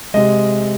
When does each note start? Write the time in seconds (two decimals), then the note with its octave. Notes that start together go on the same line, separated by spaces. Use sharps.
0.14 C3 G#3 D#5